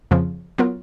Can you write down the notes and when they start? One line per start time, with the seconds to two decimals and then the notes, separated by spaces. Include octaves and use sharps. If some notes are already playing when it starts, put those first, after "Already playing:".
0.11 F2 C#3 F3
0.58 F#3 B3 F4 A#4